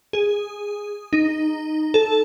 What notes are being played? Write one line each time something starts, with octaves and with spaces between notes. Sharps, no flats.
G#4
D#4
A4